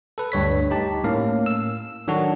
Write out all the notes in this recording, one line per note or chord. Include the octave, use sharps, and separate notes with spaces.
A4 B4
D2 G2 C#5 B6
D#4 G4 A5
A2 A#3 C#4 F5
E6
D#3 F#3 D4 F#4 A4